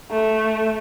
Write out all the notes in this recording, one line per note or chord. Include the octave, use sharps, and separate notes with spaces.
A3